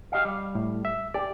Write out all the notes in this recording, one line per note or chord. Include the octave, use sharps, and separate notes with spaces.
G4 D#5 F5
G3
A2
E5
G4 D5